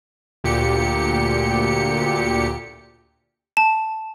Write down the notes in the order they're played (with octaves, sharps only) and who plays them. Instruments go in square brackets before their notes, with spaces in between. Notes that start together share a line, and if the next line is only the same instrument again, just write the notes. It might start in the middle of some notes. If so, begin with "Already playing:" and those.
[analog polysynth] D2 A#2 G4 C#7
[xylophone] A5